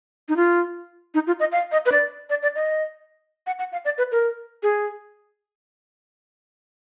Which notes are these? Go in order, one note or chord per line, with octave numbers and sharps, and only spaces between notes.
D#4
F4
D#4
F4
D#5
F5
D#5
B4
D5
D5
D5
D#5
F#5
F#5
F5
D5
B4
A#4
G#4